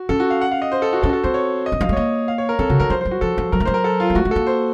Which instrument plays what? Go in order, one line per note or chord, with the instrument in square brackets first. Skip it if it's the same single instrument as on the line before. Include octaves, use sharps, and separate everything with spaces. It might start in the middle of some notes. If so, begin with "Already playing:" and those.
Already playing: [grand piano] F#4
[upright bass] C#4 [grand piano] A4
[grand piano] F#4
F5
F#5
F5
D#5
C5
A4
F#4
[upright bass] C#4 [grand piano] A4
[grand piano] F#4
A4
[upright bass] C4 [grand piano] C5
[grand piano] C#5
D#5
[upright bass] F3
[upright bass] F#3 [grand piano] F5
[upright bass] A3
[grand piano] C#5
[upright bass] A#3 [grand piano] D#5
[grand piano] F5
C#5
A#4
[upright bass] C4 [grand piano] A4
[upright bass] C#3 [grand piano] F#4
[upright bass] D#3 [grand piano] A#4
[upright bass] F3 [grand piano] C5
[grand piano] C5
[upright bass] F#3
[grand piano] F#4
[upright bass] F3 [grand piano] A4
[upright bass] F3
[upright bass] F#3 [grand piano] A#4
[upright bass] A3
[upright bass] F#3 [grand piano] C5
[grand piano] A#4
A4
F4
[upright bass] A#3
[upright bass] A3 [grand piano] F#4
[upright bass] A3
[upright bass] A#3 [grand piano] A4
[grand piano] C5